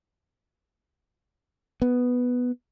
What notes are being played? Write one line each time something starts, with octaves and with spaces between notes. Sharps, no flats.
B3